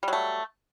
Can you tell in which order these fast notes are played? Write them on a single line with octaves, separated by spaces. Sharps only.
G3 F#3 A3